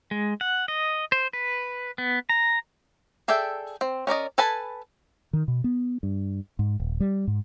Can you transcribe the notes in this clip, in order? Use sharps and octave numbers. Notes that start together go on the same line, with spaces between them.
G#3
F#5
D#5
C5
B4
B3
A#5
G#4 A4 D5 E5 G5
C4
C#4 A#4 D5 D#5
A4 B4 G#5 A5 B5
D#3
B2
B3
G2
G#2
D#1
G3
G#2